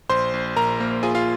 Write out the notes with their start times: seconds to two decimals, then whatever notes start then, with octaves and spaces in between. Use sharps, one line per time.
0.10 A#1 C5 C6
0.33 A#1
0.56 A#1 A#4 A#5
0.80 A#3
1.03 F4 G#4 G#5
1.15 F4 F5